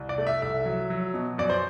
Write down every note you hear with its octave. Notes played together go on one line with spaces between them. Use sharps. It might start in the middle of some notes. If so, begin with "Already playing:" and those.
Already playing: C2
D5
A3
E5
C2 E5
F#3
F#3
B2
F#2 D5
C5